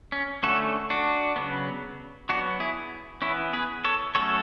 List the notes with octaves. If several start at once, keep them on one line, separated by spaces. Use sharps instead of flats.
C#4
D3 A3 C#4 F#4 A4
D4 F#4
C#3 F#3 B3
F#3 B3 D4 F#4
E4 G#4
E3 B3 C#4 E4
G#4 B4
A4 C#5
F#3 A3 C#4 A4 C#5